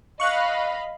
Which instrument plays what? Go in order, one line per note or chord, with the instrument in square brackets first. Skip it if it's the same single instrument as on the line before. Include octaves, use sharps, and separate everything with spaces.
[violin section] D#5 F5 B5 [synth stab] C#6 F#6